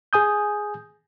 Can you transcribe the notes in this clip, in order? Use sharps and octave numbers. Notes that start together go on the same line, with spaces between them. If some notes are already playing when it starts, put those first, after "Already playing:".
G#4 G#5 D#6 G6